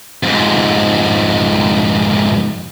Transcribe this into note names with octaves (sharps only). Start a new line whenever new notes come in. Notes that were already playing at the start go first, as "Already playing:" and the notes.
F2 G#2